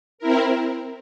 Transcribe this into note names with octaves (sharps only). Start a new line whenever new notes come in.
C4 E4 A#4